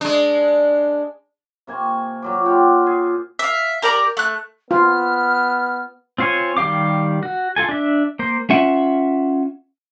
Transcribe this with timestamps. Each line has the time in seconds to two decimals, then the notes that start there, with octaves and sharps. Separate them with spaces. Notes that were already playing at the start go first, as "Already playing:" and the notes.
0.01 G#3 D4
1.67 C3 A#3 G#5 C#6
2.22 A#2 F#3 D6
2.45 F4 G4 F#5
2.87 G#4
3.39 E5 F5
3.82 G4 A#4 D5 A#5
4.17 A3 F#6
4.71 B3 F4 F6
6.18 C4 F4 C5 C#5 G#5
6.57 D#3 G3 G4 F5 D6
7.23 F#4
7.56 F4 A4 G#5
7.69 D4 E5
8.19 A#3 C5
8.50 C#4 F4 E5 F#5